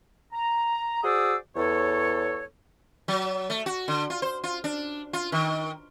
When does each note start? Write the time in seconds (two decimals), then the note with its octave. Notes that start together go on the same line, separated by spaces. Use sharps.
0.33 A#5
1.04 F#4 G#4 C5 D5 D#6 E6
1.56 E2 A4 C#5
3.08 F#3
3.50 A3
3.66 F#4
3.88 D3
4.10 F4
4.22 C5
4.43 F4
4.64 D4
5.13 F4
5.32 D#3